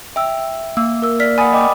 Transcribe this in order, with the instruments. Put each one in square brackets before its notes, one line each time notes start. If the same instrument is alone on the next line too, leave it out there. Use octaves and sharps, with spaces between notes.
[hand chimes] E5 [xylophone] G5 E6
[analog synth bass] A#3 [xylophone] E6
[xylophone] A#4 E6
D5 F6 B6
[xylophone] F#5 G#5 [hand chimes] B5 D#6 A6
[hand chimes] D#5 G5 D6